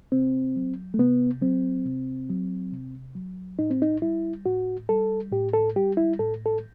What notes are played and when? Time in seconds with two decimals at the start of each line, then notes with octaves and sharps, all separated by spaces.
0.12 C3 C4
0.56 F#3
0.94 A3
0.98 C3 B3
1.42 F#3 C4
1.85 C3
2.29 F#3
2.72 C3
3.15 F#3
3.59 A2 D#4
3.70 C4
3.82 D#4
4.02 G3 E4
4.46 A2 F#4
4.89 G3 A4
5.32 A2 G4
5.54 A4
5.76 G3 G4
5.97 E4
6.19 A2 A4
6.46 A4